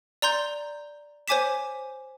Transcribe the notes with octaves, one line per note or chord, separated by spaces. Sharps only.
D5 A#5 C6 G6
C5 C#5 G#5 D6 B6 E7